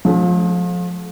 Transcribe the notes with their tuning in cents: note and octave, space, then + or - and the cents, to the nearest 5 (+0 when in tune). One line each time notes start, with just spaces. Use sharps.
F3 +30 A3 -40